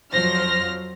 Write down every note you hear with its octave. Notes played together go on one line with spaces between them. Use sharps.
F2 F3 F#3 C5 F6 A#6